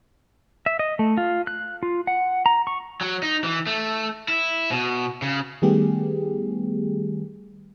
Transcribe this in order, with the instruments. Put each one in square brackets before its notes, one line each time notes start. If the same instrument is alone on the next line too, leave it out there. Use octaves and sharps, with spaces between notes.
[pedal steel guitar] E5
D#5
A3
F4
F#6
F4
F#5
A#5
C#6
[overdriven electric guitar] F#3
D#4
E3
A3
E4
B2
C#3
[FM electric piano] D#3 G3 A3 B3 G4 G#4